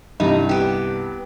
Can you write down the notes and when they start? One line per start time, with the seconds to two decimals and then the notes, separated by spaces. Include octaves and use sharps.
0.20 C2 G2 D#4
0.49 B3 G4